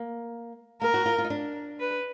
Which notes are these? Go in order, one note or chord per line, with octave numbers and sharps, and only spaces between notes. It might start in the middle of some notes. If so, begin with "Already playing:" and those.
Already playing: A#3
A#3 A#4
F#4
F4
F4
D#4
D4
B4